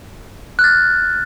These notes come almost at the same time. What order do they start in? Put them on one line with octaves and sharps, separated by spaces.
F#6 F6 A6